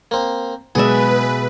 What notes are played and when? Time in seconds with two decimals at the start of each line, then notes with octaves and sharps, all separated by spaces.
0.11 A#3 C4
0.75 B2 G#3 B3 G#4 B4 D5 E5